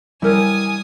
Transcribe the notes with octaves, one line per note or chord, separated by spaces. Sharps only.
G3 E4 A#4 C#5 G#5 D#6